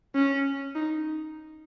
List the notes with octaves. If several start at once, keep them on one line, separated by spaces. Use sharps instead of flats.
C#4
D#4